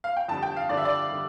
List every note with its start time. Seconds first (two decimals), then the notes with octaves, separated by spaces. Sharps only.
0.04 F5
0.17 G5
0.28 F2 D3 G3 A5
0.43 G5
0.56 F5
0.69 F2 D3 G3 D5
0.77 E5
0.85 D5
1.09 D3 G3